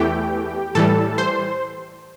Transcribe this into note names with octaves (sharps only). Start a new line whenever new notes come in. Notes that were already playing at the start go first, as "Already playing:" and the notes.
Already playing: E2 E3 A3 G4 G5
A2 E3 G3 A4 A5
C5 C6